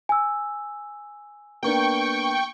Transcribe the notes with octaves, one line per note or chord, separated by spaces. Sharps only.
G#5 E6
A#3 B3 D4 G5 C#6